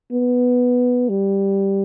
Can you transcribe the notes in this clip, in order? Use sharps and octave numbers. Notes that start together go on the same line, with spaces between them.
B3
G3